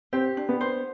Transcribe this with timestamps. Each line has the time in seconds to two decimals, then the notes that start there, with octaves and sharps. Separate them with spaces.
0.13 C4 G4
0.37 D4
0.49 B3
0.61 C5